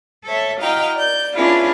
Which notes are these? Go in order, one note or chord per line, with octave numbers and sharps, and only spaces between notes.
A4 C#5 E5
E4 F#4 D#5 F5 G5 A#5
D5 G6
B3 C#4 D4 E4 F4 G#4